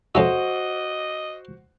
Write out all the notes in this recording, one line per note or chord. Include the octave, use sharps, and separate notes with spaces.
F2 C#4 F#4 C5 D#5 E5